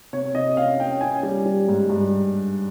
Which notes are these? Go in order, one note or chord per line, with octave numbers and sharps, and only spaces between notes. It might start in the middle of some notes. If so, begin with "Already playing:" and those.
C3 C#5
C3 D#5
C#4 F5
C#4 G5
C#4 G#5
G3
G3
G#2
G2